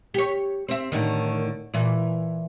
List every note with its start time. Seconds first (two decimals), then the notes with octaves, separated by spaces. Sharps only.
0.14 G4 C#5
0.69 C4 E5
0.92 A2 D3 D#3
1.74 A#2 E3